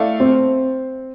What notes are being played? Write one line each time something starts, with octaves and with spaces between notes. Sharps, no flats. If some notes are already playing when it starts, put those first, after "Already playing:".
Already playing: A3 E4 A4 D5 F5
C4